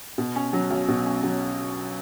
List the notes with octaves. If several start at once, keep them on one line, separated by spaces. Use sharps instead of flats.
B2
C#4
F#3
B1
B2
C#4
F#3